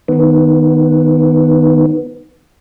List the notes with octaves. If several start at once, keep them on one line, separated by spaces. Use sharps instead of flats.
D#3 B3